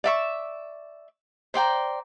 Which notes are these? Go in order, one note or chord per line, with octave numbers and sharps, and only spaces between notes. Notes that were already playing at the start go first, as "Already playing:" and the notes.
D5 E5 C#6
C5 D5 G5 A#5